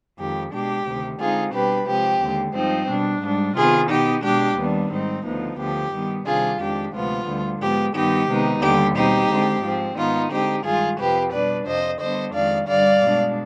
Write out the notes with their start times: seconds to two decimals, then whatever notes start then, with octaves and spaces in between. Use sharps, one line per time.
0.18 F2 D#3 G#3 G4
0.52 B2 G#3 D4 G4
0.86 D2 C3 D#3
1.19 D3 G#3 C4 D#4 F4 G#4
1.53 B2 G3 D4 G4 B4
1.87 C3 F3 G#3 C4 G4
2.21 D#2 D3 G#3
2.55 G2 F3 C4 D#4
2.89 B2 G3 D4
3.22 G#2 G3 D4
3.56 C3 D#3 B3 F4 G#4
3.90 B2 B3 D#4 G4
4.24 B2 G#3 D4 G4
4.57 D#2 D#3 G3 B3 D4
4.92 G#2 G3 C4 D#4
5.25 D2 D3 F3 B3 D#4
5.59 D2 D3 F3 G4
5.93 G2 D#3 G3 B3
6.26 C3 D#3 G3 D4 F4 G#4
6.60 F2 D#3 G#3 D4 G4
6.94 D2 C3 F3 G#3 B3 F4
7.28 D2 D3 G3
7.61 G#2 F3 G#3 B3 G4
7.95 G2 D#3 B3 D#4 G4
8.29 C3 D#3 G#3 B3 D#4
8.62 D#2 D3 G3 G4
8.96 B2 G3 C4 D#4 G4
9.30 D3 G#3 C4
9.63 G#2 F3 G#3 C4
9.97 G#2 D#3 B3 D#4 F4
10.31 D3 G#3 C4 D#4 G4
10.65 G2 D#3 G#3 F4 G#4
10.99 F2 C3 F3 C4 G4 B4
11.32 B2 G3 D4 B4 D5
11.66 F2 C3 F3 C5 D#5
12.00 D3 G3 B3 D4 C5 D#5
12.34 F2 D#3 G#3 D5 F5
12.68 G2 D3 G3 D5 F5
13.02 B2 G#3 D4